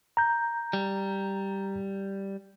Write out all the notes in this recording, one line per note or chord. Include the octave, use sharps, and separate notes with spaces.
A#5 G6
G3